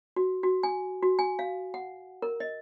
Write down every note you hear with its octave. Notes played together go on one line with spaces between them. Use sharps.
F#4
F#4
G#5
F#4
G#5
F5
F#5
A#4
D#5